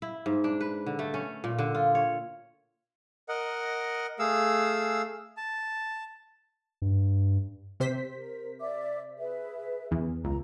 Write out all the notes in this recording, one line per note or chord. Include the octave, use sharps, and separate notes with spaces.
E4
G#2
D4
B4
D3
A3
C#4
A#2
D3
F4
C#5
A#4 D#5 F#5
A3 G#4 F5 E6
A5
G2
C3 C5 B6
A#4
D5 E5 D6
G#4 B4 E5
E2
C#2 A#5